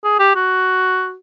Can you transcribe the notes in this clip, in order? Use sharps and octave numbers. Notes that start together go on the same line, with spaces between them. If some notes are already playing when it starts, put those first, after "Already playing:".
G#4
G4
F#4